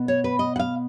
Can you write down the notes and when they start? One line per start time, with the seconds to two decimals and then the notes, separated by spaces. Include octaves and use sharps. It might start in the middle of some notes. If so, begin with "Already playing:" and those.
Already playing: B2 B3
0.08 C#5
0.24 B4
0.39 D#5
0.56 F#5
0.59 F5